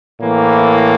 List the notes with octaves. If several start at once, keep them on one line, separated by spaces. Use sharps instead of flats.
A2 E3 A#3